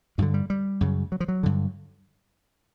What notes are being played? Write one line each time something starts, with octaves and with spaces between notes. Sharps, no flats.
G2 D3 F#3
G3
G3
F#2 C#3
F#3
F3
F#3
G2 D3